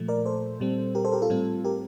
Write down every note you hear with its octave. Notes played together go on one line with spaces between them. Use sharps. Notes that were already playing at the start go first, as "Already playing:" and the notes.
Already playing: A#2 F3 A3
A#4 D5
A4 C5
A#2 G3 C4
G4 A#4
A4 C5
G4 A#4
F4 A4
A2 G3 C4
G4 A#4